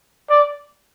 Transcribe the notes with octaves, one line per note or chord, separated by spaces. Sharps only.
D5